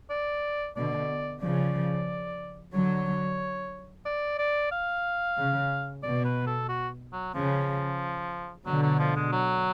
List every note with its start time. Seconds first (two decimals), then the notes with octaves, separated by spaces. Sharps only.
0.10 D5
0.76 B2 D3 D5
1.42 C#3 F3 D5
2.74 D3 F#3 C#5
4.06 D5
4.38 D5
4.71 F5
5.37 C#3
6.03 B2 D5
6.25 B4
6.47 A4
6.69 F#4
7.13 F#3
7.35 C#3 F3
8.66 B2 D3 F#3
8.83 F#3
8.99 F3
9.16 G#3
9.32 F#3